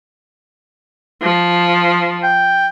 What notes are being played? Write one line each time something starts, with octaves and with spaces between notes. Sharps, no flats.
F3
G5